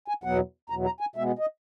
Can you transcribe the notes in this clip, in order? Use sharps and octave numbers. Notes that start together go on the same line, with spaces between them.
G#5
E2 B2 F#3 B3 F#5
E2 B2 F#3 B3 A#5
A#5
G#5
B2 G#3 B3 E5
D#5